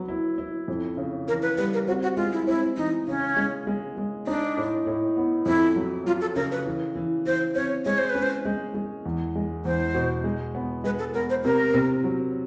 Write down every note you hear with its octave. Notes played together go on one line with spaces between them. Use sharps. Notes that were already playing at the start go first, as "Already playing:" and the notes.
Already playing: F#3 B3
E4
E4
F2
C#3
E3 A#4
B4
G3 B4
A#4
C4 F#4
F#4
G#3 F4
E4
C4 E4
E3 D#4
C#3 C#4
G#3
G#3
G#3
D4 D#4
A2
A2
B3
F2 E4
F#3
F#3 F4
A4
C#3 A#4
B4
E3
E3
E3 C5
C4 C#5
G#3 C#5
C5
B4
C#4
C5
G#3
G#3
E2
G#3
E2 C5
B2
G#3
B3
G#3 B4
A4
B3 A#4
C5
C3 A#4
C3
F#3